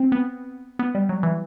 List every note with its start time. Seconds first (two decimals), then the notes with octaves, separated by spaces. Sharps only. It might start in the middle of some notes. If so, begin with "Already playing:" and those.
Already playing: C4
0.12 B3
0.79 B3
0.95 G3
1.09 F#3
1.23 E3